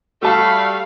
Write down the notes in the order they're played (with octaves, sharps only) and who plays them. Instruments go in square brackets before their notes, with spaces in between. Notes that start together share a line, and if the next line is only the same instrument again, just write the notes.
[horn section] G3 A3 [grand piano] F#4 A5 [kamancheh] F5 B5